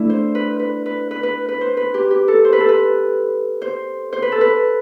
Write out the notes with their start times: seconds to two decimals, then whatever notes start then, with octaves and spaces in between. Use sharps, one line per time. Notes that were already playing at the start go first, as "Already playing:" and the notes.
Already playing: A3 D4 E4
0.10 C5
0.35 B4
0.59 B4
0.86 B4
1.11 B4
1.23 B4
1.49 B4
1.61 C5
1.77 B4
1.94 G4
2.10 G4
2.28 A4
2.45 C5
2.53 B4
2.60 A4
2.69 B4
3.62 C5
4.13 C5
4.22 B4
4.32 A4
4.41 B4